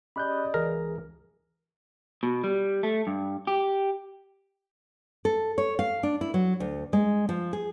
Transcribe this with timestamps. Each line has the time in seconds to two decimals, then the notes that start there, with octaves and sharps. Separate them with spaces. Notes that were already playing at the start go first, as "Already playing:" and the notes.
0.16 C#4 G4 G#4 D5 D#5 B5 F#6 G6
0.54 C#2 E3 G#4 A#4
2.23 B2
2.44 G3
2.83 A3
3.07 G2
3.47 G4
5.25 A4
5.58 C#5
5.79 F5
6.03 D4
6.21 E4
6.34 F#3
6.60 D2
6.93 G#3
7.29 F3
7.53 G#4